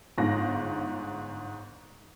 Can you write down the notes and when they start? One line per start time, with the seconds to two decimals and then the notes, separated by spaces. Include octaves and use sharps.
0.18 G1 G#2 A#6